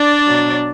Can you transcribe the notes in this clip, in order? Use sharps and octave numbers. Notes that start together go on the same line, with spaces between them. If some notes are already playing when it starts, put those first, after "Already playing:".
Already playing: D4 D5
B2 F#3